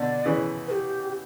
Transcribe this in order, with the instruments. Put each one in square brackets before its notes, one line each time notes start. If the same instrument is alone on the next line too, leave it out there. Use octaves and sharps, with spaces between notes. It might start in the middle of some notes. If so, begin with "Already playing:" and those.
Already playing: [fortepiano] B2 D3 [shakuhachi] D5
[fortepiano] C#3 E3
[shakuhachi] B4
G4
G4